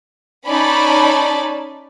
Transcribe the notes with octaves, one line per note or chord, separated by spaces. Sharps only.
C#4 D#4 D5 A5 B5